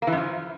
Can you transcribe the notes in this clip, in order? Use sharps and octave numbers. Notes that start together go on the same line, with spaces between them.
A#3
E3
F#2
F3